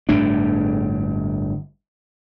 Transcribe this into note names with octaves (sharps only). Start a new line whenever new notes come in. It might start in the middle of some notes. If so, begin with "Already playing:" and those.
G1 A2 A3 D4